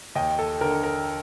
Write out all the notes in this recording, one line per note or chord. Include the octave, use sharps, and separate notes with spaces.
D#2 D#5 G5
A4
D3 A#4
A#4